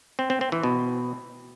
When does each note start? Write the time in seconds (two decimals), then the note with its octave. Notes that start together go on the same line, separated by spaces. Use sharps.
0.19 C4
0.30 C4
0.41 C4
0.52 E3
0.63 B2